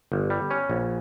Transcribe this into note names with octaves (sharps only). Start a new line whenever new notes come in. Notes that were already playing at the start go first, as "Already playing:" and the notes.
G1
G3
C#4
A#1